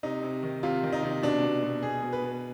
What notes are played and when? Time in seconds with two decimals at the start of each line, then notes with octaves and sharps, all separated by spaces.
0.03 C3 D#4
0.23 C3
0.43 D#3
0.63 C3 F4
0.83 D#3
0.93 D#4
1.03 C3
1.22 B2 D4
1.42 B2
1.63 B2
1.82 B2 G#4
2.02 B2
2.13 B4
2.22 B2